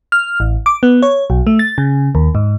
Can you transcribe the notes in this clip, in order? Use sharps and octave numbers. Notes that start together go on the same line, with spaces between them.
F6
A1
D6
B3
C#5
B1
A3
A6
C#3
D#2
G#2